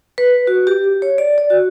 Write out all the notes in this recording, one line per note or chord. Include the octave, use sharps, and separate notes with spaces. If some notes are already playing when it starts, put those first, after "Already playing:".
B4
F#4
G4
C#5
D5
D5
F#4